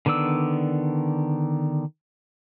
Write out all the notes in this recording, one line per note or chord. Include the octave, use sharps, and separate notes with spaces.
D3 D#3 B3 D5 E6